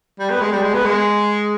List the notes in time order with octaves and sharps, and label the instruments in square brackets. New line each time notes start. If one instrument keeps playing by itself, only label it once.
[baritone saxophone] G3
B3
G#3
G3
G#3
B3
G#3